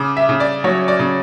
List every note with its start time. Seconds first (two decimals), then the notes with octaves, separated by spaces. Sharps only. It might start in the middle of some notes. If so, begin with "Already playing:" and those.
Already playing: C#3 D6
0.17 E5
0.29 C#3
0.40 D5
0.64 F#3 C#5
0.88 D5
0.99 C#3